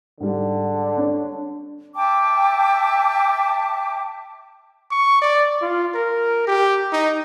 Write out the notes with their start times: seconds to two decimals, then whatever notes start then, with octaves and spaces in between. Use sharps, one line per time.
0.20 G#2 D3 G3
0.97 D4 C#5
1.95 E5 G5 A5 D6
4.91 C#6
5.22 D5
5.62 F4
5.95 A#4
6.47 G4
6.93 D#4